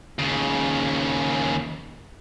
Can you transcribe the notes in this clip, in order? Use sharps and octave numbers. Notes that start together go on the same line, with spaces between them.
D#2 C#3